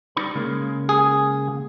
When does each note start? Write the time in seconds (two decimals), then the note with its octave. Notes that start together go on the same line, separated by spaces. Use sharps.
0.17 G3 D#4 B5
0.35 C#3 G#3 A#3
0.89 G#4